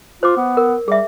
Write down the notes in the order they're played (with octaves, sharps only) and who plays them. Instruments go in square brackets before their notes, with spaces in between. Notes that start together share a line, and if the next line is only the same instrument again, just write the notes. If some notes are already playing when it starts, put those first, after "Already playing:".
[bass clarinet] F4 [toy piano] C5 D6
[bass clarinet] B3
[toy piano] A#4
[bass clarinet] G3 [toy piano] G#4 E5